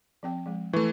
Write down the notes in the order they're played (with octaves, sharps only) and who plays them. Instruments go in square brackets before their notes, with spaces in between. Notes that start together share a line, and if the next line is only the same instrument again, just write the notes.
[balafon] F3 C4 G5
F3 G#3
[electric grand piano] E3 A3 [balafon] B4 C#6